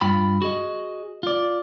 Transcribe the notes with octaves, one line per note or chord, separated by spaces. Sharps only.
G2 F4 G5 B5
F#4 G#4 D#5
F4 D5